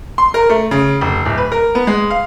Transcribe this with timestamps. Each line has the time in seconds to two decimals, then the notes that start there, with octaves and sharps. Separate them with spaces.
0.18 C6
0.34 A#4
0.49 A3
0.71 C#3
1.01 F1
1.25 D1
1.38 B4
1.52 A#4
1.75 B3
1.87 G#3
2.10 F5